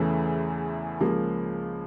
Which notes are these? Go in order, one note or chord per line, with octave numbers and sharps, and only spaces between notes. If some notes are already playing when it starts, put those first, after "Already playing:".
Already playing: E2 C#3 E3 A3
C#2 C#3 F3 A#3